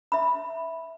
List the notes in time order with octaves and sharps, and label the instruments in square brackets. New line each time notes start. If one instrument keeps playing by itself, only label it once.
[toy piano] E5 B5